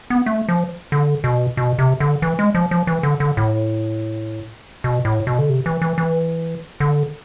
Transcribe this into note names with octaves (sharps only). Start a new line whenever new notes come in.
B3
A3
F3
D3
B2
B2
C3
D3
E3
G#3
F3
F3
E3
D3
D3
A2
B2
A2
B2
D3
C3
E3
E3
E3
D3